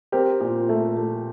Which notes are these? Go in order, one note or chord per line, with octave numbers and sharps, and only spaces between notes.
C4 G4 A#4
A#2
A3
A3